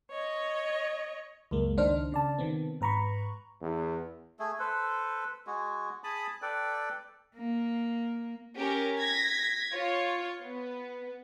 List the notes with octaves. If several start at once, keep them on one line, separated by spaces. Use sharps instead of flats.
C#5 D#5
C#2 F#2 G#3 A#3
C#2 D#3 D4 D#4 C5 F6
C#3 D5 A5
C3 D#3 B3 C4
G#2 B4 A#5 B5 C#6
E2
A3 G#4
A4 B4 C5
G#3 F#4 G#4
G#4 A5 B5 D#6
A4 B4 D5 G5
A#3
C#4 G4 A#4
G#6 A#6 B6
F4 C#5
B3